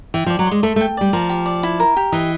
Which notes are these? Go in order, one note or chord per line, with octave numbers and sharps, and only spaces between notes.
E3 G5
F3
D5
F#3
G#3 C6
A3 A4
A3
G5
G3 D5
F3 A#4
G4
D5
E4
A#4
G4
E3 D#5